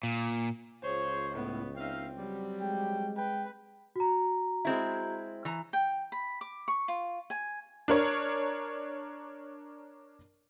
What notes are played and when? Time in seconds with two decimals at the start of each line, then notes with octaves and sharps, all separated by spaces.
0.03 A#2
0.83 C#2 F4 G#4 C5 C#5
1.34 A2 B3
1.77 C4 D#4 E5 F5
2.18 F#3 G3
2.62 G#3 G5
3.17 B4 G5
3.96 F#4 A#5
4.65 G#3 C4 E4
5.45 E3 A#5
5.73 G5
6.12 B5
6.41 D6
6.68 C#6
6.88 F4
7.30 G#5
7.88 D4 A#4 C#5